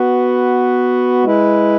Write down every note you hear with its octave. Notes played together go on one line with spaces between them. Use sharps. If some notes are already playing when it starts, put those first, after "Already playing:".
Already playing: B3 F#4 B4
G#3 E4 B4